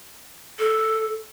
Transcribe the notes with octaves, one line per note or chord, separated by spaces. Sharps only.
A4